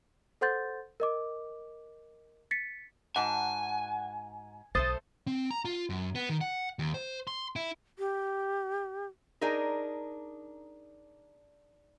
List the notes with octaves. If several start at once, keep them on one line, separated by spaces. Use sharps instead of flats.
A4 C5 F#5 C6 G6 A6
A#4 D#5 D6
A6 B6 C#7
G#2 F#4 F#5 G#5 A5
B1 A3 A4 C5 D#6 A6
C4
A#5
F4
F#2
B3
D#3
F#5
D#2
C5
C6
E4
G4
D4 D#4 G#4 A#4